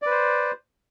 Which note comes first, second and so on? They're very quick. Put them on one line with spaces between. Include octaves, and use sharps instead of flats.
D5 B4 C5